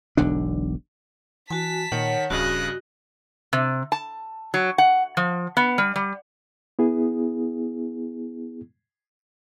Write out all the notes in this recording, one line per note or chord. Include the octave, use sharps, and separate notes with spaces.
E1 B1 D3 D4
E3 F#4 G#5 A5 B6
A#2 D#3 C#5 F#5
D1 G2 C#3 F#4 D#5 F#6
C3
A5
F#3
F#5
F3
B3
G3
G3
B3 E4 G#4